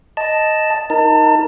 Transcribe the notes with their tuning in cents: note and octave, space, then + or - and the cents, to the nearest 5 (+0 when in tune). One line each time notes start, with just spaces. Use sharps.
D#5 +0 A5 +0
D#4 +10 A#4 +0 A5 +30